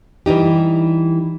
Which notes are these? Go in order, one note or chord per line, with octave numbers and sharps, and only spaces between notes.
E3 G3 D#4 G4